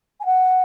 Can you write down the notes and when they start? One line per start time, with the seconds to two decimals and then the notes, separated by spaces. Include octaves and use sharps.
0.20 G#5
0.25 F#5